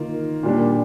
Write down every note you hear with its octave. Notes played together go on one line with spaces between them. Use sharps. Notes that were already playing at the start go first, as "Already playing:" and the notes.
Already playing: D#3 A#3 F4
A#2 G3 D4